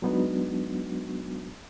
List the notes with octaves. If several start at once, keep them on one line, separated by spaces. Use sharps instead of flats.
F#3 G#3 B3 D4 D#4 F#4